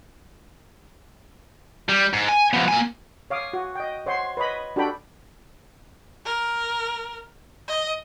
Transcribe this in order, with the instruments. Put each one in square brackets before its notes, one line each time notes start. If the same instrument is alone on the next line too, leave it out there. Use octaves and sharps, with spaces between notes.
[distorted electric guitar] G3
G#2
G#5
F3 B3
A#3 G#5
[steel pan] C#5 F5 D6 D#6
F#4
D#5 G5
C5 C#5 F#5 C6
B4 C#5 D#5 B5
D4 F#4 G4 A4 G5 B5
[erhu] A#4
D#5